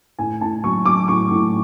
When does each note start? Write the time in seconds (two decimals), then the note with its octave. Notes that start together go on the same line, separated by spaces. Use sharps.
0.19 A2 G#5
0.41 A2 A5
0.64 F#3 C#6
0.86 F#3 D6
1.08 A2 C#6
1.31 A2